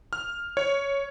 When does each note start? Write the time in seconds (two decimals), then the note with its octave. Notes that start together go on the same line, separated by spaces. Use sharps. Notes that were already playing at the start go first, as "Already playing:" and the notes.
0.13 F6
0.57 C#5